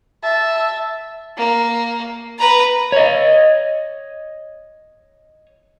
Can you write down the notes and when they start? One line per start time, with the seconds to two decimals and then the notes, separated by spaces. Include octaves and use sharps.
0.24 E5 A5
1.37 A#3
2.39 B4 A#5
2.92 C#5 D#5